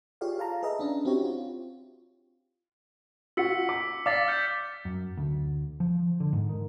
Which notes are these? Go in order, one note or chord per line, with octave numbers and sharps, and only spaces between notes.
F4 G4 G#4 C#5 D5 F5
A4 F5 A5 A#5
G#4 B4 D#5 E5 A#5
C#4 D4
C4 E4 F#4 G4 C#5
F4
F4 F#4 E6 B6 C#7
D6
D5 F5 D6 A6 B6
F6 G6 C#7
F#2
D2
F3
D3
G#2
D#3